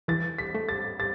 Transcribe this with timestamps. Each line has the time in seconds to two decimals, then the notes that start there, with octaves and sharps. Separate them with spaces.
0.08 E3 A6
0.38 B6
0.55 A3
0.69 A6
1.00 A6